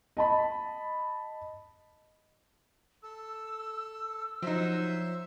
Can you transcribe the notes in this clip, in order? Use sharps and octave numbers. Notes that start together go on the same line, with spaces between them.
D#5 A5 B5
A4 E6
F3 F#3 D#4 C5 E5